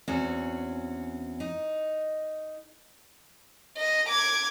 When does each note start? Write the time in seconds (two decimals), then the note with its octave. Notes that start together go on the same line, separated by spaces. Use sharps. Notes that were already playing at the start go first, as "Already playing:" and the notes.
0.08 E2 C4 C#4 F#4
1.40 D#4
3.77 D#5
4.09 D6 G#6